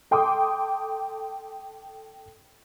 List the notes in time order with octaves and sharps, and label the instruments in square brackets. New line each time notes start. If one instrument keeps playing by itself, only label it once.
[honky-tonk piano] A4 G5 C6 D6 D#6